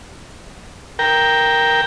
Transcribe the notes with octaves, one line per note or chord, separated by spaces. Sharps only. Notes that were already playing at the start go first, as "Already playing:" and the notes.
A#4 G5